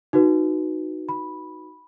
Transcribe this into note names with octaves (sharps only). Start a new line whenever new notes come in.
D#4 F#4 B4
B5